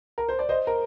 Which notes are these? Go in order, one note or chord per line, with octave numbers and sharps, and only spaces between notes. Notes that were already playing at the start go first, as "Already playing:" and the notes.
A#4
C5
D5
C5 D#5
A#4